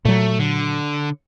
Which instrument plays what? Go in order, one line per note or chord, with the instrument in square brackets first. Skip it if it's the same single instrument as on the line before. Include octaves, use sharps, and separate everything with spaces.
[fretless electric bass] A#2 F#3 [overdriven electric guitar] A3
[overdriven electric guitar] D3